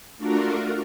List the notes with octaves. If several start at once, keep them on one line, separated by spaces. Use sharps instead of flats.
A3 D4 F4 F#4 A#4